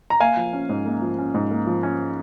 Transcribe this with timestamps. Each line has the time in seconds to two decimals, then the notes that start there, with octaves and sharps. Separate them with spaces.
0.10 A#5
0.20 A#3 F5 G#5
0.37 F3
0.53 C#4
0.69 G#2
0.86 A#3
1.02 F3
1.19 C#4
1.34 G#2
1.51 A#3
1.67 F3
1.83 C#4